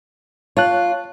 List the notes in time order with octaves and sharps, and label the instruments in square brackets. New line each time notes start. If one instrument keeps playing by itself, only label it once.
[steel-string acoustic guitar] F4 [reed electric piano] C#5 A5 F#6